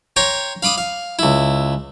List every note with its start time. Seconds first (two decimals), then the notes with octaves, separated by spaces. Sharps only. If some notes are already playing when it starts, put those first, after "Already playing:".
0.16 C#5 G5 A#5 C6 C#6
0.62 F5 B5 D6 D#6
0.78 F5
1.19 C#2 E4